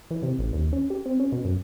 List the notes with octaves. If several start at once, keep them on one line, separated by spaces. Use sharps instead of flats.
E3
C3
A1
D#2
C#4
G4
C4
C#4
B2
F#2